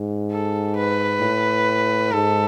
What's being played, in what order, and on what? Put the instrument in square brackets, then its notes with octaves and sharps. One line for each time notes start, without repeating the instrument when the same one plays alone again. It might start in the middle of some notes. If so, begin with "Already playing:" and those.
Already playing: [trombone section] G#2
[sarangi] A4
B4
[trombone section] A2
[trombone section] G#2 [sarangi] A4